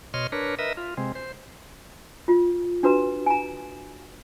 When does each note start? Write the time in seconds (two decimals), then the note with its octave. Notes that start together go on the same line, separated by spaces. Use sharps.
0.14 B2 C#5 D#5 C6 F6
0.32 D4 A#4 B4 C#5
0.59 A#4 B4 D#5 E5
0.77 F4
0.97 C3 G#3 C4
1.15 C5
2.28 F4
2.83 D4 F#4 B4 A#5
3.26 G#5 A#5